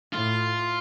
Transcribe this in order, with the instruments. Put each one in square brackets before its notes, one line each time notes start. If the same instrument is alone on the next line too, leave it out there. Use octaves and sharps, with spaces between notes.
[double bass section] A2 [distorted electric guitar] F4